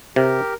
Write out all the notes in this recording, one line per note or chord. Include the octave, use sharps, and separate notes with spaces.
C3 G4 A#4